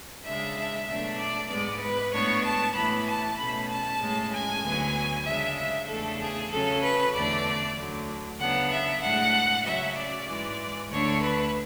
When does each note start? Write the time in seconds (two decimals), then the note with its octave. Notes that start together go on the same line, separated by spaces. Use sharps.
0.24 C#3 G#3 D4 E5
0.86 B2 F#3 A3 D4 E5
1.17 D5
1.49 G#2 G#3 B3 D5
1.80 B4
2.12 A2 G#3 B3 D4 C#5
2.43 A5
2.74 A2 E3 B3 B5
3.05 A5
3.37 B2 A3 C#4 B5
3.69 A5
4.00 A2 G#3 C#4
4.31 G#5
4.62 D2 D3 F#3 B3
5.25 C#3 G#3 D4 E5
5.56 E5
5.88 E2 C#3 E3 A3 D4 A4
6.19 G#4
6.51 C#3 F#3 C#4 A4
6.82 B4
7.13 E2 D3 A3 D4 D5
7.76 D2 D3 F#3
8.38 C#3 F#3 B3 D4 F#5
8.71 E5
9.02 A2 G#3 D4 F#5
9.64 C#3 F#3 C#4 E5
9.95 D5
10.27 G#2 E3 G#3
10.90 D2 D3 A3 D4 C#5
11.21 B4